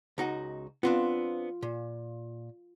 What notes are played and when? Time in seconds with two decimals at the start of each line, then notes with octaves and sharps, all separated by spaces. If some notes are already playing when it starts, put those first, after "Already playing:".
0.18 C#2 D#4 F#4
0.83 B3 C4 D4 F4
1.63 A#2